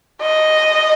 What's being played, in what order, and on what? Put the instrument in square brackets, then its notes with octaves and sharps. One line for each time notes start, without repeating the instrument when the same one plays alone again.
[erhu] D#5